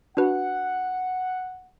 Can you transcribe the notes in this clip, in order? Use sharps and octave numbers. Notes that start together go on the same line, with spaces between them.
D4 F#4 B4 F#5